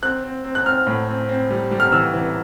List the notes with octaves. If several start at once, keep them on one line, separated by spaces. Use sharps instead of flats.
C4 F#6
C4
C4
F#6
C4 F6
A2
C4
C4
G3
G3
F6
E3 E6
E3